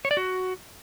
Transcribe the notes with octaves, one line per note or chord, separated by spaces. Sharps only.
C#5
D5
F#4